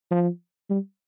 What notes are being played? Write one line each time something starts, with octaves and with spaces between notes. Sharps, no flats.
F3
G3